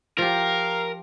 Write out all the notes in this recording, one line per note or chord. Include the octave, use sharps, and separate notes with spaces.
F3 G4 A#4 F5